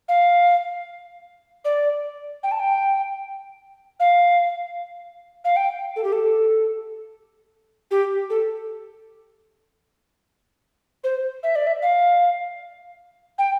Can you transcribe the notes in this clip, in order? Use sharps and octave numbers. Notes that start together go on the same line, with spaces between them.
F5
D5
G5
A5
G5
F5
F5
G5
A4
G4
A4
G4
A4
C5
E5
D5
E5
F5
G5